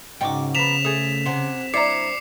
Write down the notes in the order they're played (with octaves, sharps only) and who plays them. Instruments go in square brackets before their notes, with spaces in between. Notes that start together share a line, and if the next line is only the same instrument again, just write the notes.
[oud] G#2 D#4 F#4 [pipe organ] C#3 [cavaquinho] G5 C#6 D6
[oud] F3 B3 [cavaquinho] A#5 B5 [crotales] B6 E7 F7
[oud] A3 [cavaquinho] G#4 D#6
[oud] C3 [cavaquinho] C5 F#5 G#5
[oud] G3 C4 D4 [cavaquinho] E4 A#5 [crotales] D6 C7 C#7